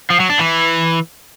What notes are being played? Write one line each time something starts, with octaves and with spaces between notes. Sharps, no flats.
F3
F#3
D4
E3